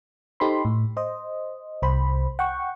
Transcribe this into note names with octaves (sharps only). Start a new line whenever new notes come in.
D#4 G4 A4 C5 B5 C6
A2
C5 D#5
C2 C5 B5
F#5 G5 C#6